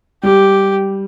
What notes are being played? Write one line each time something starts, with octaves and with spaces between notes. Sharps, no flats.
G3 G4